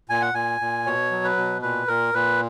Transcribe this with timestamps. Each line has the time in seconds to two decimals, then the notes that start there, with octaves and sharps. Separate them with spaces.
0.09 A#2 G#5
0.22 F#5
0.34 A#2 G#5
0.61 A#2
0.85 B2 C#5
1.11 F#3
1.24 B4
1.37 B2
1.62 A#2 B4
1.88 A#2 A#4
2.14 A#2 B4